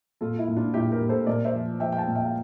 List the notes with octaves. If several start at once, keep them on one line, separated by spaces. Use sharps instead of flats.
A#2 F4 A4
E4
A#2
D4 F4
A#2 E4 G4
G4 A#4
A#2
A4 C5
A#2 A#4 D5
C5 E5
F3
F3 E5 G5
G5
F5 A5
A#2
E5 G5
F5